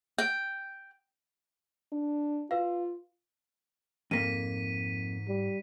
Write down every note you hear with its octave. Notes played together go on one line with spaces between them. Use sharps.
G5
D4
F4 B4 F5
F2 G#2 A#3 B6 D#7
G3